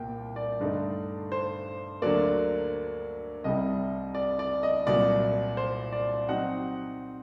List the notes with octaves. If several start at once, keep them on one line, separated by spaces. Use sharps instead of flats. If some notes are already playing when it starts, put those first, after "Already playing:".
Already playing: C2 A#2 A#3 G5
D5
G2 D3 A3 D#4
C5
D2 D3 F#3 A#3 D5
C2 C3 G3 D#5
D5
D5
D#5
C2 A#2 F#3 D5
C5
D5
F#3 C4 D#4 F#5